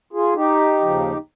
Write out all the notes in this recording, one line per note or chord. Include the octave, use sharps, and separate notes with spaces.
F4 G#4
D#4 G4
D#2 C#3 F3